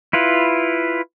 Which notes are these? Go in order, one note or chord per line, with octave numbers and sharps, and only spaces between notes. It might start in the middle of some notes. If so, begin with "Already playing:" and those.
E4 F4 B4